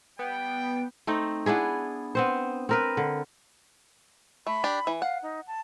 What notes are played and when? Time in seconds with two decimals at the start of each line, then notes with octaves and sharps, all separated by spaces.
0.19 G3 B3 G5
1.07 A3 C4 D#4
1.46 B3 D4 E4 G#4
2.15 B3 C4 C5
2.69 C4 A#4 B4
2.97 D3
4.47 A3 B5
4.64 D4 G4
4.87 E3
5.02 F5 F#5
5.23 D#4
5.47 A5